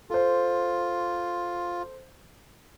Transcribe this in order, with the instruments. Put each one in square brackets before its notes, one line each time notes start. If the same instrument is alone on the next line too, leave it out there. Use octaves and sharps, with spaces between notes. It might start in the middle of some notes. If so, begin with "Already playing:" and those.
[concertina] F4 [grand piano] A4 C5